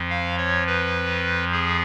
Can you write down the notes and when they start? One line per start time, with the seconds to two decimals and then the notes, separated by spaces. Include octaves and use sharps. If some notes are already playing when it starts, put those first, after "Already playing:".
Already playing: F2 F3
0.10 F5
0.38 C#5
0.67 B4
1.52 G#4